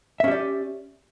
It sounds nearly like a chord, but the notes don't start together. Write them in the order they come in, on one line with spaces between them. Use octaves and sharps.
E5 C#4 G4 D5